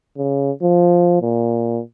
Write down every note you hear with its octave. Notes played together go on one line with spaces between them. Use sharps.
C#3
F3
A#2